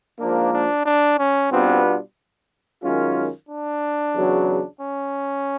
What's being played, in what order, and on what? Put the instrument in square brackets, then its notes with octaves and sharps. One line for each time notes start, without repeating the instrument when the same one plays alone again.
[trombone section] G#2 F3 A#3 [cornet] D4
[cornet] D4
D4
C#4
[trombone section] B2 G3 B3 D4 F4 [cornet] C4
[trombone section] F#2 D#3 G#3 C#4 F4
[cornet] D4
[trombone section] E2 C#3 F#3
[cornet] C#4